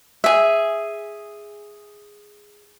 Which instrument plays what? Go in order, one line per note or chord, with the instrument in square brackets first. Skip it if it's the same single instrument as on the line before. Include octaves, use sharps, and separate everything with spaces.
[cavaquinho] G#4 E5